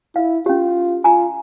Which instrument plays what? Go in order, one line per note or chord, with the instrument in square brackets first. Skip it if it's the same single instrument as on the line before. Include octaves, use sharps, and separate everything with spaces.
[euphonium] E4 [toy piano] F5
[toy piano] C#4 G4 [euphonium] F4
[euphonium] F4 [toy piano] G#5 A#5